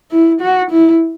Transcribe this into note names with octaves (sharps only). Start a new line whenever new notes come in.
E4
F#4
E4